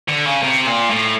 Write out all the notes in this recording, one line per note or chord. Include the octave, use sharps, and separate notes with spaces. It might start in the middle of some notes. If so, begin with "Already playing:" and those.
D3
C#3
C3
A#2
A2